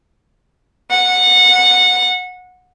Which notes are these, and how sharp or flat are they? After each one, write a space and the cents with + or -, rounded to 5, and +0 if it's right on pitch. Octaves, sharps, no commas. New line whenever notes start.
F#5 -20